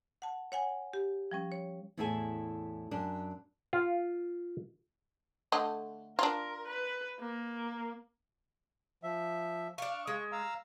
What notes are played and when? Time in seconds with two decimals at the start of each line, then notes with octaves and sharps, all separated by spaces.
0.22 F#5 A5
0.52 C#5 F#5 G#5
0.93 G4
1.31 F3 G3 C#4
1.52 C#5
1.97 E2 A2 E4 G#4 A4 G#5
2.91 F#2 D4
3.73 F4
5.52 D3 A3 D#5
6.19 D4 F4 A#4
6.68 B4
7.20 A#3
9.03 F3 E5
9.78 D4 F5 C#6
10.07 G#3
10.32 F5 A#5 E6